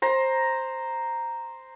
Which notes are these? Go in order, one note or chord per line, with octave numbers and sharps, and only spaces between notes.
C5 A#5